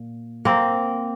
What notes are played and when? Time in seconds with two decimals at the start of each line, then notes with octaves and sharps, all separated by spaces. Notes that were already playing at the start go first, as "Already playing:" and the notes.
Already playing: A#2
0.45 A#3 C4